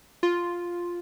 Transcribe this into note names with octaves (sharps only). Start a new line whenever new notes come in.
F4